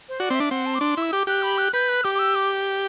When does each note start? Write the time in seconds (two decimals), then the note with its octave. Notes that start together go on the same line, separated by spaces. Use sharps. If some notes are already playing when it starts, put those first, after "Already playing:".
0.09 C5
0.20 F#4 D5
0.30 C4
0.35 E5
0.40 D4
0.51 C4 F#5
0.66 A5
0.75 D6
0.81 D4 C6
0.97 E4
1.02 E6
1.13 G4 D6
1.27 G4 F#6
1.43 B5
1.58 F#6
1.73 B4 G6
1.89 F#6
2.04 G4 D6
2.15 D6
2.19 E6
2.35 D6